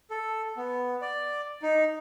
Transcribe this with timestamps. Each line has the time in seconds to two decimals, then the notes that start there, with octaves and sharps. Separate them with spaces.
0.11 A4
0.57 B3
1.01 D5
1.63 D#4